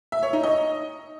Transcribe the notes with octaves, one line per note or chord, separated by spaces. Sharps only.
E5
C#5
D#4
D#5